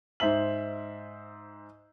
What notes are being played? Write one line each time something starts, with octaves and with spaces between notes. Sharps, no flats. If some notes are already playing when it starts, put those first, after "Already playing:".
G#2 C5 E5 F#7